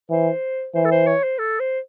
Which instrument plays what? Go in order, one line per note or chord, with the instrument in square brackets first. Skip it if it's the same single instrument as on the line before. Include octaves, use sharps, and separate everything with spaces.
[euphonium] E3 [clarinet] C5
[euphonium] E3 [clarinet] C5
[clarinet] A4
C5
C#5
C5
A4
C5